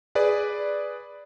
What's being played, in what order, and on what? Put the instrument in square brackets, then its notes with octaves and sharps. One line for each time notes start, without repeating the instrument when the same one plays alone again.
[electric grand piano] G#4 B4 D5